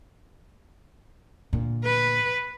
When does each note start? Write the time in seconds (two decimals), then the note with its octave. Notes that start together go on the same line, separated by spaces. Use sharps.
1.53 A#2 D3
1.84 B4